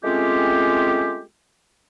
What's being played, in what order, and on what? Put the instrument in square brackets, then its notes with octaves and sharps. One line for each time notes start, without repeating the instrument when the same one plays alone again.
[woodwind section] G#3 A3 C4 C#4 F4 G4